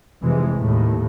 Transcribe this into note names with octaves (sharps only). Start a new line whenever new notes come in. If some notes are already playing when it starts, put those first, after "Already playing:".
F1 F2 C3 E3 G#3
D#2 A2